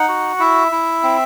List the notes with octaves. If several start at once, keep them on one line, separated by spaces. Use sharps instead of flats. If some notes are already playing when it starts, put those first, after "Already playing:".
Already playing: D#4 F#5
F#4
E4 E5
E4
C4